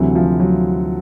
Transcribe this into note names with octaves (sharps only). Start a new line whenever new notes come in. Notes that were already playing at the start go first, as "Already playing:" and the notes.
Already playing: D2 C3 E3 F#3
F3
F#3